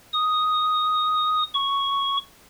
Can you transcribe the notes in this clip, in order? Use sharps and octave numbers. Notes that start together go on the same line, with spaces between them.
D#6
C#6